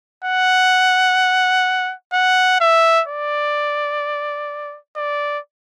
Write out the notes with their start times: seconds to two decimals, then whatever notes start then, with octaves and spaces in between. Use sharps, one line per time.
0.24 F#5
2.13 F#5
2.60 E5
3.08 D5
4.97 D5